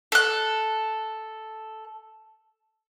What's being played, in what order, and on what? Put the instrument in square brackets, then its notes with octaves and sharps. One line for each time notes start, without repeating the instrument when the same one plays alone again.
[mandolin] A4 F#6